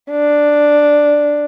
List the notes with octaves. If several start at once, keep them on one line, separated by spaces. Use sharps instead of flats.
D4